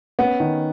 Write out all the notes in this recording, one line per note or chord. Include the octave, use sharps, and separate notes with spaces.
B3 C#4
D#3